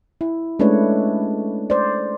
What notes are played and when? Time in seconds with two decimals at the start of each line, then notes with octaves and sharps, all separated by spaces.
0.21 E4
0.59 G#3 A3 C#4 D4 B4 C#5
1.70 C5 D5